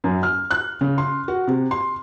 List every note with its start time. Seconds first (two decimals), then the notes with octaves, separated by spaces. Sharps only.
0.04 F#2
0.23 F6
0.51 F#6
0.81 C#3
0.98 C6
1.28 F#4
1.47 C3
1.71 C6